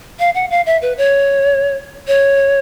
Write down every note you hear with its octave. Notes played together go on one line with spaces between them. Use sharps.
F5
F#5
F5
E5
B4
C#5
C#5